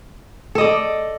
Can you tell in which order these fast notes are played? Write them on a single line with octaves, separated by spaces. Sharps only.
A4 D#5 D5